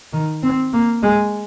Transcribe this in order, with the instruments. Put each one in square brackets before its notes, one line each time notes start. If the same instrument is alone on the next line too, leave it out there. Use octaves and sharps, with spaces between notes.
[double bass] D#3
C4
A#3
G#3